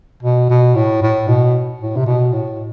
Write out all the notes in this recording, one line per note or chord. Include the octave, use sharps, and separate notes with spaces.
B2
B2
A2
A2
B2
A2
C3
B2
A2